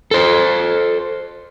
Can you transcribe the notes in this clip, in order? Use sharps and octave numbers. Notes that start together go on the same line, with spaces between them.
A4 C5